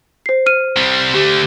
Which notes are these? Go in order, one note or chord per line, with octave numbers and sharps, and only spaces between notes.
C5 C7
F6 D#7
C3 G3
D3 A3 G4